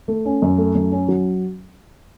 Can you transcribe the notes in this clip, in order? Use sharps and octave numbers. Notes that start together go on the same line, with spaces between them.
A3
C#4
F#2
A3
F#2
C#4
F#3